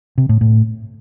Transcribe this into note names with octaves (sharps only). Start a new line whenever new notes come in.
C3
A2
A2